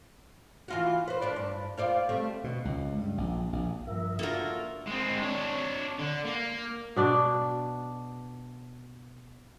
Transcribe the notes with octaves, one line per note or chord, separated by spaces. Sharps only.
E3 F4 F#4
B4 C5
D4 C5 D5
G2
F4 C5 D5
G3 A3 C4
B2
C#2
G2
A#1
A#1
G2 F3 A#4 E5
A#3 D4 F4 F#4 A4 A#4
G#3 C4
D4 C#5
D3
A#3
B2 D4 D5